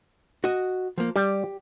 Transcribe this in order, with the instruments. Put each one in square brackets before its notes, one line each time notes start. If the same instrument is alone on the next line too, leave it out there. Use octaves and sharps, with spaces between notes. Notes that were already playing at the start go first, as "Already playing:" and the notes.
[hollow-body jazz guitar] F#4 D#5
F3 A#3
[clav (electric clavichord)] G3 [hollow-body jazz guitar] G4